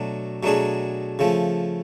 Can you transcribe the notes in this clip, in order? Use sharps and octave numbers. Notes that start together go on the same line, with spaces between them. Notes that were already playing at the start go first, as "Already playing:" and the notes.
Already playing: B2 F#3 A3 D4
B2 F#3 A3 D4 G#4
C#3 F3 A3